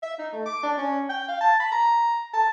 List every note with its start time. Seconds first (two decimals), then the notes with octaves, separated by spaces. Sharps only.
0.02 E5
0.18 D#4
0.33 A3
0.46 D6
0.63 D4
0.77 C#4
1.09 G5
1.28 F5
1.41 A5
1.60 B5
1.72 A#5
2.33 A5